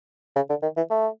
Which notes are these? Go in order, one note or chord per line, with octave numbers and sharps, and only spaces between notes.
C#3
D3
D#3
E3
A3